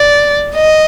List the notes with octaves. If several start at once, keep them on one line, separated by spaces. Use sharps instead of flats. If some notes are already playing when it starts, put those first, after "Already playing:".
Already playing: D5
D#5